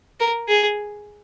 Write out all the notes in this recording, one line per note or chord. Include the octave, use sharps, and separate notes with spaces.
A#4
G#4